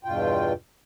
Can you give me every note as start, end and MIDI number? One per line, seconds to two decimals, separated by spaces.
0.05 0.53 40
0.05 0.53 43
0.05 0.53 47
0.05 0.53 65
0.05 0.53 79